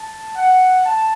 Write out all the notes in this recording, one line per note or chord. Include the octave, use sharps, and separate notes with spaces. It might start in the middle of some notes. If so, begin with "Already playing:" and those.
Already playing: A5
F#5
A5